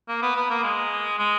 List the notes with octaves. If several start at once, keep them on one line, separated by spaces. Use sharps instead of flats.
A#3
B3
B3
A#3
G#3
G#3